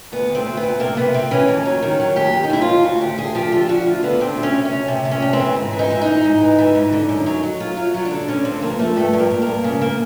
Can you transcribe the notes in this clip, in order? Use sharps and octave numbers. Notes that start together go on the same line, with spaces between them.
D2 B3
D2
C4
D2
B3
D2
C3 A#3
C3 B3
C3 C4
E3 C#4
D#2
F#3
D#3
F#3
D#2 G4
D#2
D#4
D#2 E4
F4
D#2
D2 F#4
D2 G4
D2 G#4
F3 G4
D3 F4
D3 F#4
D2 F4
D3 B3
D2 C4
D2
C#4
C3
C#4
D2
C3
C3
C#4
D2
C4
E3
G#2
E3
D#4
E3
D#4
G#2
G#2
E3
E3
G#2
D3
F#2
F#3
F#3
F#2 F4
F#3
F#3
D4
D3
D3 C#4
G2 C4
F3 A#3
F3 A3
G2 A3
G2
A#3
G2
G2 A#3
C#3
A#3